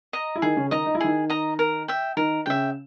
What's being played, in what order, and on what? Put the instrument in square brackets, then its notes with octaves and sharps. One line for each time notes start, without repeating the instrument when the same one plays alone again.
[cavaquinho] D#5 A#5
[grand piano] E4
[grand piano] D#3 D#4 [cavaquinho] G#4
[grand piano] C#3 C#4
[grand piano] D#3 D#4 [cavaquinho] D#5 A#5
[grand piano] D#4
E4
[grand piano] D#3 D#4 [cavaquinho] G#4
[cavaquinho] D#5 A#5
A#4
E5 G5
[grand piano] D#3 D#4 [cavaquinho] A#4
[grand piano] C#3 C#4 [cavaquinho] E5 G5